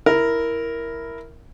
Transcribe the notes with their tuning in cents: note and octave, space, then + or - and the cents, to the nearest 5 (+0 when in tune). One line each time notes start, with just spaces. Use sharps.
E4 +0 A#4 +0